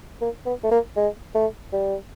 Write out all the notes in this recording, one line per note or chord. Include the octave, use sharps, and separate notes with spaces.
A#3
B3
A3
A#3
G#3
A3
G3